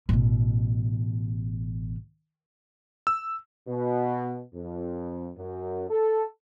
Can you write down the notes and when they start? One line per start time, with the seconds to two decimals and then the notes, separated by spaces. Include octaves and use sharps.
0.09 A1 B2
3.07 E6
3.67 B2
4.54 F2
5.36 F#2
5.90 A4